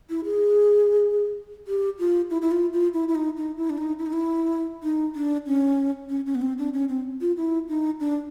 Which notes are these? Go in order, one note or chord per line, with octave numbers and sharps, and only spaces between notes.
E4
G#4
G4
F4
E4
E4
F4
F4
E4
E4
D#4
D#4
E4
D4
D#4
E4
D#4
E4
D#4
D4
C#4
C#4
C#4
B3
C4
D4
C#4
C4
F4
E4
D#4
D4